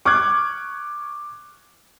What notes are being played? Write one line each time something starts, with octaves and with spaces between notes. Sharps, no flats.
C#6 D6 F6 F#6 G#6